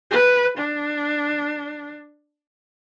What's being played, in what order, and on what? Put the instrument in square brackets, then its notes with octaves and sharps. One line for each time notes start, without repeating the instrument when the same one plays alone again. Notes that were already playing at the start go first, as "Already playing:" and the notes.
[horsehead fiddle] B4
D4